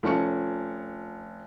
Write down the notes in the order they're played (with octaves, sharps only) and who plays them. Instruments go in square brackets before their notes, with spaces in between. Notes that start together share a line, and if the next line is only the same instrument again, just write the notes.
[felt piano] F1 F3 C#4 C#6 C#7